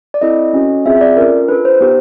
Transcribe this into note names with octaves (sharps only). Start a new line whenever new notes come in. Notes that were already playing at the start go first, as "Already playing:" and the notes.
D5
C4 E4 A4 D#5
C#4 F#4 A4
C4 F4 G#4 E5
D5
C#4 F4 A4 A#4
D4 F4 A4 B4
C5
B3 D#4 G4